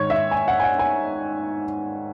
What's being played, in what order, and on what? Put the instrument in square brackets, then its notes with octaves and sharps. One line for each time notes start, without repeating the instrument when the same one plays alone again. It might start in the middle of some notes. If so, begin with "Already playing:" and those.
Already playing: [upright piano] G#2 D#3 C#5
E5
G#5
F#5
G#5
F#5
G#5